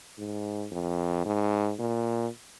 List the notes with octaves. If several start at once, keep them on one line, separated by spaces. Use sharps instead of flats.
G#2
F2
G#2
A#2